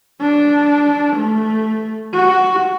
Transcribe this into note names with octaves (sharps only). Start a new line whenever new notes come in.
D4
A3
F#4